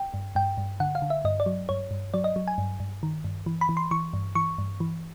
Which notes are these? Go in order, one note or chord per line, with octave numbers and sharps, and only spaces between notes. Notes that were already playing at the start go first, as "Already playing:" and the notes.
Already playing: G5
G2
G2 G5
G2
D3 F#5
F5
D3
E5
G2 D#5
D5
F#3
G2 C#5
G2
F#3 D5
D#5
F#3
G#5
G2
G2
D#3
G2
E3
B5
E3
C6
E3 C#6
G2
E3 C#6
G2
E3